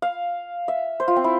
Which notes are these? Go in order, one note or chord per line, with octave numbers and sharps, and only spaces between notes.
F5
E5
C5
F4
C4
E4